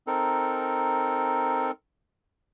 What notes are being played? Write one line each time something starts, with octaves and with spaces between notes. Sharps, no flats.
C4 D#4 A4 A#4